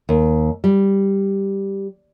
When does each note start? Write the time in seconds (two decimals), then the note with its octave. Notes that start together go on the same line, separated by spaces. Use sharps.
0.09 D#2
0.64 G3